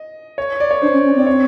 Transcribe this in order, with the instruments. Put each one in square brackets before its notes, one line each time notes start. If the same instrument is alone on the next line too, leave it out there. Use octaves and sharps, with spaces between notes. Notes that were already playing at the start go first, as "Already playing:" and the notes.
Already playing: [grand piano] D#5
C#5
D5
C#5
[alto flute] D4 [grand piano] C5
[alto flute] C#4
C#4
[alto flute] C4 [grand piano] D5
[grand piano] C#5